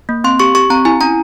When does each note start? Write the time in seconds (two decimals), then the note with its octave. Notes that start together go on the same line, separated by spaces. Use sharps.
0.09 A#3
0.24 C4 C6
0.40 G4 C#6
0.55 G4 C#6
0.70 C4 A#5
0.85 E4 G#5
1.01 C#4 A#5